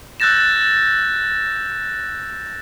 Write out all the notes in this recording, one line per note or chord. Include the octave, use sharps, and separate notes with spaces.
E6 F#6 G6 A6 A#6 E7